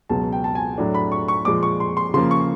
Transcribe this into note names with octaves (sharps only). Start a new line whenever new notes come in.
C#2 B2 F#3 A5
G5
A5
G#5
A2 F#3 A3 D4
B5
C#6
C#6
A#2 F3 G#3 D6
C#6
C6
C6
C#3 F3 A#3 C6
C#6